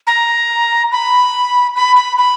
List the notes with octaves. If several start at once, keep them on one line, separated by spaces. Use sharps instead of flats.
A#5
B5
B5
B5
B5